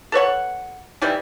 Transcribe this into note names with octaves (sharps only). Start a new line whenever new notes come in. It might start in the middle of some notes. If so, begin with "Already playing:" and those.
A4 B4 C#5 F#5
D#3 E3 G3 E4